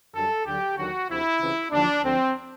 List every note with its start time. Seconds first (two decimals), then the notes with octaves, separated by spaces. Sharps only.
0.14 F#2 D3 G3 A4
0.45 D2 D3 F#3 G4
0.77 D#2 D3 F#3 F#4
1.08 D2 C3 F3 E4
1.40 C#2 C3 E3
1.71 D#2 D3 F3 D4
2.03 D2 D3 F3 C4